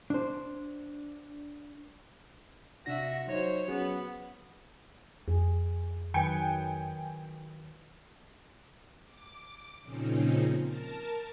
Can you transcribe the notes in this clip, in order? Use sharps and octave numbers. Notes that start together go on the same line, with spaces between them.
D4 C5
C3 D4 F#4 E5 A#6
F#3 D#4 C5 C#5
F#3 B3 C#4 G#4
F2 G#4
D#3 F#3 B4 G5 G#5 C#7
D6
A#2 C#3 F3 C4 C#4 D#4
A#4 A5